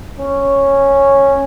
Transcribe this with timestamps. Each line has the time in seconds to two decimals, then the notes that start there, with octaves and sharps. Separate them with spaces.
0.19 C#4